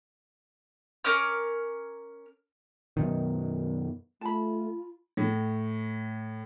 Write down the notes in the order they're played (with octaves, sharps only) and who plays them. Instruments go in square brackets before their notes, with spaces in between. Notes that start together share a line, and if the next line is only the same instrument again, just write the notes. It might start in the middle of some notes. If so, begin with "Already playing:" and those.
[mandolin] C#4 A#4 D6 F6
[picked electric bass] F#2 B2 D#3
[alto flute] A3 [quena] F4 [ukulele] A5 B5
[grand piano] A2